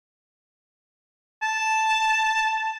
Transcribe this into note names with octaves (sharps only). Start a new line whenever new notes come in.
A5